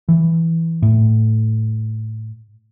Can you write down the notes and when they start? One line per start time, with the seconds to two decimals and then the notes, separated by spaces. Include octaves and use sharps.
0.09 E3
0.82 A2